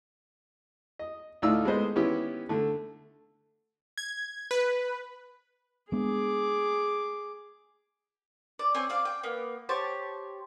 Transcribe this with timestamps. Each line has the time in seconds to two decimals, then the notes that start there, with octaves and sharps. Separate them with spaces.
0.99 D#5
1.42 D2 A2 D#4 F4 D5 E6
1.65 G#3 A3 B3 C5 D#5
1.95 D#3 E3 B3 C#4 E4 G4
2.49 D3 A3
3.98 G#6
4.51 B4
5.92 G#3 B3 D4 G#4 D6
8.59 D5
8.75 C4 C#5 G#5
8.89 C5 D5 F5
9.05 G5
9.23 A#3 B3
9.69 G4 C5 C#5 A5